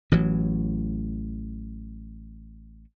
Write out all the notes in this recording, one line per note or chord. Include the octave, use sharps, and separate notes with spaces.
A1 E3 F#3